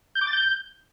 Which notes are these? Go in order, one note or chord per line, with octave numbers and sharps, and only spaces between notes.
G6
D6
A6
G6